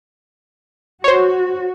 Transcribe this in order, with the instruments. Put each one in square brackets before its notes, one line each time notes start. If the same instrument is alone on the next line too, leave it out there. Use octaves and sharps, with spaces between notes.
[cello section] F#4 [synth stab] C5 C#5